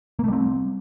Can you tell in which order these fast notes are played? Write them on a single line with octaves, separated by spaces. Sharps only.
A#3 A3 G3 C4